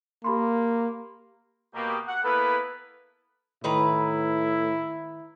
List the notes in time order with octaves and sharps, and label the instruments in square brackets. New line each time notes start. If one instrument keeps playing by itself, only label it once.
[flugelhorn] A#3 [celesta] G4 B5 C6
[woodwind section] B2 A#3 G4
F#5
A#3 B3 E4 A4 B4
[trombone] A2 [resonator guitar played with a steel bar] D#3 B4 A#5 [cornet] E4